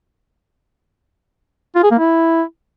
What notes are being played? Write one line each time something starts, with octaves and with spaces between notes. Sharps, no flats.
F4
G#4
A#3
E4